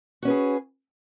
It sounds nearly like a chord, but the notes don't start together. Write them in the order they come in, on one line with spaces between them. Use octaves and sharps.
F#4 C#4 B4 G#4